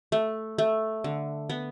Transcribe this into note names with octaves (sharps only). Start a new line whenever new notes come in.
A3
A3
D3
B3